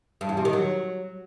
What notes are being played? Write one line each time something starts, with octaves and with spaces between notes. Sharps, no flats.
G2
E2
C3
D#3
F#3